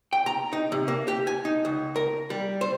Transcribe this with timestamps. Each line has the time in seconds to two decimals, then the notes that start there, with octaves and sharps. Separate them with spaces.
0.13 G5
0.26 A#5
0.53 D#4
0.72 C3
0.88 A#3
1.08 G4
1.27 G#5
1.45 D#4
1.65 C#2
1.96 A#4
2.30 G3
2.61 C5